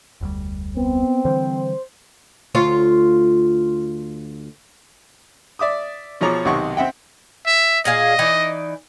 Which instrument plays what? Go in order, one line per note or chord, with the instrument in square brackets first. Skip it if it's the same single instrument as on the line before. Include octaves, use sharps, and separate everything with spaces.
[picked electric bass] F1 D2 G3
[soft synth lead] B3 [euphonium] C4
[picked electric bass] D3 E3 G3 [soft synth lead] C5
[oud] D2 F4 C#5
[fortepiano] D5 E5 D6 D#6
B2 F3 G#4 C#5 A#5 D6
B1 C3 D#3 F#5 C#6
C4 E5 F#5 G5
[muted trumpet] E5
[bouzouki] A#2 G#4 F5 [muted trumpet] D#5
[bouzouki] E3 D#4 D5